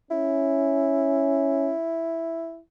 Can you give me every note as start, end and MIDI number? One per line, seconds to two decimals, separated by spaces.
0.11 1.74 61
0.11 2.60 64